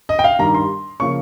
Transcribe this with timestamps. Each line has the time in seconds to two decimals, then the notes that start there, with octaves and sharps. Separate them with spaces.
0.09 D#5
0.19 G5
0.24 F5
0.39 G2 D#3 G3 A#5
0.55 C6
1.00 C#3 F3 A#3 C#4 C#6